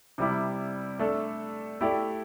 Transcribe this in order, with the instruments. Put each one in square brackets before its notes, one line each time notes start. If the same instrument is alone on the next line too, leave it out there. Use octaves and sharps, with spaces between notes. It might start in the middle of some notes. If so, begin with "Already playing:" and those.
[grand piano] C3 G3 E4
A3 D4 A4
A3 E4 G4 D5